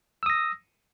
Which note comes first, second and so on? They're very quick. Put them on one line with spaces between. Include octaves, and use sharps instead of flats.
E6 D#6 A#6